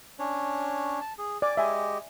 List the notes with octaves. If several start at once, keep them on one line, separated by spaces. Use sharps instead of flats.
C#4 D4 C#5
A5
G#4
D5 G#5 D6
G#3 G4 D#5 E5 G#5